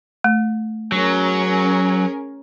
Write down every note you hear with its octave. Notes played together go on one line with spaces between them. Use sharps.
A3
F#3 C#4 G#4 A#4